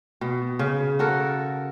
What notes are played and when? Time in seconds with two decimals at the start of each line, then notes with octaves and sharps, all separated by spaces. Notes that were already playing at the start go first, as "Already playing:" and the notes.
0.21 B2
0.59 C#3
0.99 F#4 A4 A#4